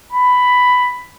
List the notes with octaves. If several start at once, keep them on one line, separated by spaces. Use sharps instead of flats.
B5